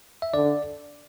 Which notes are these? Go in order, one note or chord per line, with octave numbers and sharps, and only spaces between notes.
E5
D3 D5